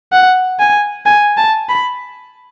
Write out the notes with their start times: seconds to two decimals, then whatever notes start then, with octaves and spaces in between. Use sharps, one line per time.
0.12 F#5
0.59 G#5
1.06 G#5
1.37 A5
1.69 B5